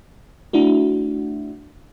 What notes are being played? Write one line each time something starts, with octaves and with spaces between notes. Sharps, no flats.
A3 D4 E4 F#4